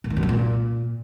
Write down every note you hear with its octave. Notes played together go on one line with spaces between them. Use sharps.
A2
D#3
F#2
G#2
A#2